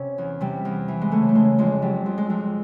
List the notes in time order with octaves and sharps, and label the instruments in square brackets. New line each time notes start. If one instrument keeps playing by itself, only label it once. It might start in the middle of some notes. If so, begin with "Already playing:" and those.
Already playing: [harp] C3 C#4
E2
C3 G3
E2
E3
G#3
C#3 A3
A3
C#3 G#3
F2 G#3
F#3 G3
F2
G#3
F2